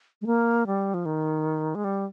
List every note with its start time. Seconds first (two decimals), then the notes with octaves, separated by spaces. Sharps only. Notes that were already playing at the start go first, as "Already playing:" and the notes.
0.22 G#3
0.26 A#3
0.67 G3
0.94 F3
1.05 D#3
1.75 G#3
1.84 G3